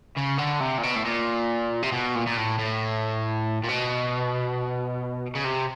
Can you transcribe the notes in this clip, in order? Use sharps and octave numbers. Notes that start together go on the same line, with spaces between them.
C#3
D3
C3
A#2
B2
A2
A#2
C3
B2
A#2
A#2
A2
A2
A#2
B2
C#3
C3